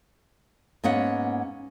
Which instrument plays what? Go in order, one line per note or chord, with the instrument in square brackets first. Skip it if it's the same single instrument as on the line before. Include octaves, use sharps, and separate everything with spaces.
[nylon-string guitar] G#2 A#3 B3 C#4 F#5